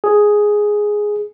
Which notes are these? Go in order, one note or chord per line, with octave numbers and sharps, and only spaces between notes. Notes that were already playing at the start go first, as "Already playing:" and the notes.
G#4